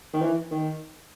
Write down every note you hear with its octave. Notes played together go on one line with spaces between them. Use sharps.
D#3
E3
D#3